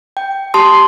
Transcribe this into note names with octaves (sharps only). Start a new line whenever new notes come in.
G5
G4 A5 C6 D#6